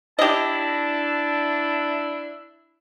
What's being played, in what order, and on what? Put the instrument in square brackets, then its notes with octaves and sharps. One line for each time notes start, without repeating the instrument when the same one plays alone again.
[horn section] D4 E4 [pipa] G4 D#5 [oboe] A5